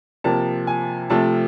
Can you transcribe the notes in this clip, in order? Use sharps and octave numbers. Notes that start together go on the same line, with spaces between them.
C3 F3 A#3 A5
G#5
C3 F3 A3 A5